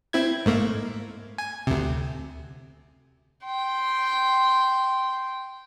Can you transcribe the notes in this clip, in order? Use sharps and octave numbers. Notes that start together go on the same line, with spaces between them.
C4 E4 G#6
G#2 A3 A#3
G#5
D2 C3
G5 C6